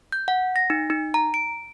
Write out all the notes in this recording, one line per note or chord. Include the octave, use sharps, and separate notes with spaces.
G6
F#5
A#6
D#4
D#4
A#5
D7